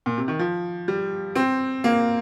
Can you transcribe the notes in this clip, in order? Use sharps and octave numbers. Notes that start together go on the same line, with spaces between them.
A#2
C3
D#3
F3
G3
C4
A#3